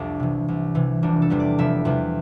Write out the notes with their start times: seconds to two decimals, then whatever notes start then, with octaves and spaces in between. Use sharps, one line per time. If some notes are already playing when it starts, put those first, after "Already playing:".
Already playing: C2 F2 G3 D4 G4 A4
0.20 C3 E3
0.48 C2
0.75 C3 E3
1.03 F1 D4
1.22 A4
1.30 E2 C3 G3 B3
1.40 D5
1.58 F1 E5
1.85 E2 C3 G3 B3